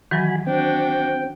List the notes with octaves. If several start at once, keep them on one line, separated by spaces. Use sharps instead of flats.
D#3 E3 F#3 F#4 G#5 B5
C4 D4 F#4 G5